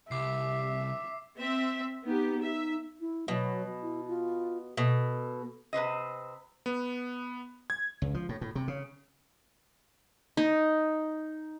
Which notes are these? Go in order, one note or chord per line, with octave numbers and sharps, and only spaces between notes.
C2 E5 D6 C7
C4 E5
B3 D#4 G4
E5
E4
B2 F#3
E4
F4
B2 A4
C3 B4 C5 D#5
B3
G#6
C#2
F3
A2
A2
C3
C#3
D#4